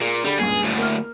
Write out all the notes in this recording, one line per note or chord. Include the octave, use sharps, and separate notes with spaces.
A#2 G#4
D3 G3 G#4 B5
C#2 G2 A#2 G#4
D2 A2
A#3 F6